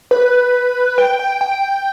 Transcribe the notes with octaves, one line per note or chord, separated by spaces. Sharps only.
B4
G5
G5
G5